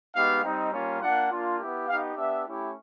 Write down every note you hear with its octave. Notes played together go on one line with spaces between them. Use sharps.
G#3 B3 D#4 G4 F5
G3 C4 D#4
G3 A#3 C#4 F4
A#3 D4 F4 F#5
A#3 D4 F4
B3 E4 G4
B3 D#4 G4 F5
B3 D4 G4 E5
A3 C#4 E4 G4